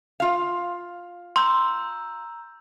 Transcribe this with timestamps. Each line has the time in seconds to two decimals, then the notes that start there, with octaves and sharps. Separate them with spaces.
0.20 F4 F5
1.36 A#5 C6 E6 G6